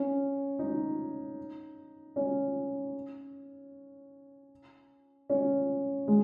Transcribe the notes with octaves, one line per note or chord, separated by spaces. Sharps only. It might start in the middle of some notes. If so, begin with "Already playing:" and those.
Already playing: C#4
D#4
C#4
C#4
G#3